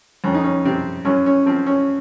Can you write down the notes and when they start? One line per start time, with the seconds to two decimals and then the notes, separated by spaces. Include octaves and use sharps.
0.24 F2 C#4
0.34 D#4
0.44 C#4
0.65 C3 C4
1.05 F#2 C#4
1.26 C#4
1.46 F3 C4
1.66 C#4